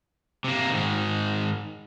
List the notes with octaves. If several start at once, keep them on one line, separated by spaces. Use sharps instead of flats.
C3 A#3
G#2 D#3